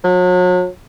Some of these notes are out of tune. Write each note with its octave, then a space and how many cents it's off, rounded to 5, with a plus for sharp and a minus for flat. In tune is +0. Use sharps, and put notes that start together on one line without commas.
F#3 -40